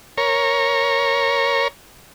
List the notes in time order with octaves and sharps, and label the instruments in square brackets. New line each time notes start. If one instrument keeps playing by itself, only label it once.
[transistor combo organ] A#4 C#5